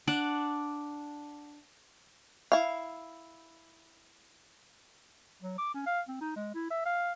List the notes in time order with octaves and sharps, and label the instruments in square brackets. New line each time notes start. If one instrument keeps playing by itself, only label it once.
[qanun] D4 D5 F#5
[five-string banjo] E4 F5
[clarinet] F#3
D6
C#4
F5
C4
D#4
G#3
E4
E5
F5